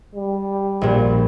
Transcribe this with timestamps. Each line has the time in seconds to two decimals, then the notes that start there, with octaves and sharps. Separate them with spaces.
0.15 G3
0.81 A#1 A#2